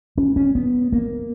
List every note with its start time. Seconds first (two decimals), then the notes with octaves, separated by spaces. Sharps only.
0.18 C#4
0.36 C#4
0.55 B3
0.93 A#3